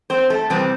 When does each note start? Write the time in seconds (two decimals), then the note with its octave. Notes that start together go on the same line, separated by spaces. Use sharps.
0.10 C4 C5
0.30 A3 A4
0.50 E2 C3 G3 C4 B4